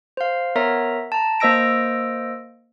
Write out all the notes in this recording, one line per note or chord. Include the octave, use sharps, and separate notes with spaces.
C5 F5
B3 A#4 C#5 E5 A#5
A5 A#5
A#3 C5 D#5 E6 A#6 D7